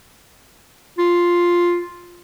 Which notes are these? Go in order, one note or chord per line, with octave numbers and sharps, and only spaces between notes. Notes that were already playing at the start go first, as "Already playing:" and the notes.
F4